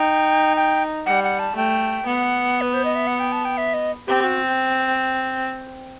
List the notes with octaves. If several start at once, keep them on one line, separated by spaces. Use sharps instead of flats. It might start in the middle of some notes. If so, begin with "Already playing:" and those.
Already playing: D#4 G5
G5
G3 F#5
F#5
A5
A3 G5
B3 F#5
B4
C5
D#5
E5
F#5
G5
A5
G5
E5
D#5
C4 G4
F#4